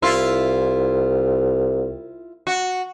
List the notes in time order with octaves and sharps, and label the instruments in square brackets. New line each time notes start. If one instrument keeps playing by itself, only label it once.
[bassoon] C2 [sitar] E4 F4
[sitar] F#4